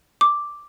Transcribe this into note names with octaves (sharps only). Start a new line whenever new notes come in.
D6